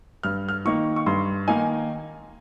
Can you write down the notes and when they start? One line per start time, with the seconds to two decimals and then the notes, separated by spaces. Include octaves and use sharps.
0.23 G2 F6
0.49 F6
0.65 D#3 A#3 D#4 C#6
0.96 C#6
1.06 G2 C6
1.48 D#3 A#3 D#4 G#5